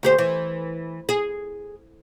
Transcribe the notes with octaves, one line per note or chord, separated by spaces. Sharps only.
D2 G4 C5
E3
G#4